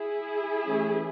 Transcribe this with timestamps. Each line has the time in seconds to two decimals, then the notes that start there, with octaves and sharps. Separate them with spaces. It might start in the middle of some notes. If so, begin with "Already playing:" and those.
Already playing: E4 G#4
0.67 E3 A3 C#4